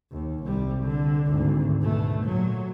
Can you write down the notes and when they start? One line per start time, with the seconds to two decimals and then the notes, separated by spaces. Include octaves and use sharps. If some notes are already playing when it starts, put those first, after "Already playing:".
0.12 D#2
0.44 C2 G3
0.84 D3
1.28 G#1 D2
1.81 B2 A3
2.25 A#2 F#3